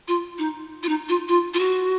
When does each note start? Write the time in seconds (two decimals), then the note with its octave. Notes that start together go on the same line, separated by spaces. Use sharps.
0.08 F4
0.39 D#4
0.83 F4
0.89 D#4
1.09 F4
1.28 F4
1.54 F4
1.59 F#4